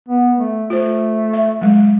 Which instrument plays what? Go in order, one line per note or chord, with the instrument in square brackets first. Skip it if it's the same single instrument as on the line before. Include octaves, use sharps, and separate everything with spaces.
[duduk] B3
A3
[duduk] A3 [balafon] F4 C5
[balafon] E5
F#3 G#3